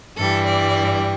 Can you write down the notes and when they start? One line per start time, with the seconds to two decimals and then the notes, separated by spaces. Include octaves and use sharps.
0.16 G2 E3 G3 A4
0.46 D5